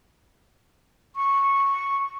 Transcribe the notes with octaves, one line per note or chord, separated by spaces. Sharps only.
C#6